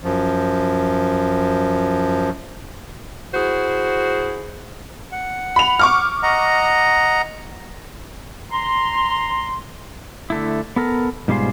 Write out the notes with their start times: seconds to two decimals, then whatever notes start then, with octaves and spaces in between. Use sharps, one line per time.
0.04 F#2 F3
3.34 E4 F#4 G#4 C5
5.12 F#5
5.56 B5 F7
5.79 C#6 D6 F6
6.23 D#5 F#5 A#5
8.51 A#5 C6
10.30 D3 A3 E4
10.76 B3 A4 A#4
11.28 G#2 B2 G3 F4 G#4 C5